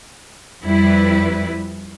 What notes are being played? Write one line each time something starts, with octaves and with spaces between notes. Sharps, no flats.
F2 G3 E4 B4